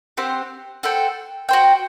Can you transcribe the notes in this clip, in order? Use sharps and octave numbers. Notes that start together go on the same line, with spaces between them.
C4 G4 C5 F#5
F#4 A4 C5 G5
F#4 C5 G5